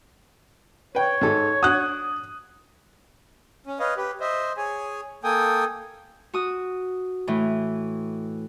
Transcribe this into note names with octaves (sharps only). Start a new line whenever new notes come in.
B4 C#5 G5
G#2 A4
D4 F#4 D#6 F#6
C#4
B4 C#5 D#5 F5
G4 B4
C5 D#5 E5
G#4 C#5 G#5
A#3 A4 G5 G#5 D#6
F#4 D#6
A2 E3